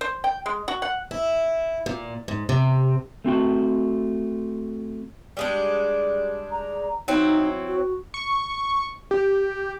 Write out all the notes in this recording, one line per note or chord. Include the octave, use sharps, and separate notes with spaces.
C5
G5
G#3
F#4
F#5
E4
A#2
G#2
C3
A3 C4 F#4 G5
G3 G#3 D4
A#5
F#3 C4 D#4 E4
F#4
C#6
G4